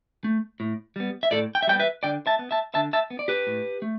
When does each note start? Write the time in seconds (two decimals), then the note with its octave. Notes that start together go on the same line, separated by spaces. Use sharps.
0.24 A3
0.60 A2
0.96 G3 B3
1.23 E5
1.31 A2 A4 D5
1.55 G5
1.62 E5
1.67 G3 B3 D5 G5
1.80 B4 E5
2.03 D3 D5 G5
2.27 E5 A5
2.39 B3
2.51 E5 A5
2.74 D3 E5 A5
2.93 E5 A5
3.10 B3
3.19 D5
3.28 G4 B4
3.47 A2
3.82 A3